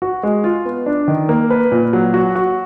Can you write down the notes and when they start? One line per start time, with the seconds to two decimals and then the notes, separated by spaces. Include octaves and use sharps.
0.02 F#4
0.23 G#3
0.44 F4
0.65 B3
0.86 D4
1.08 D#3
1.29 A#3
1.50 B4
1.72 A#2
1.93 F#3
2.14 F#4
2.36 F#4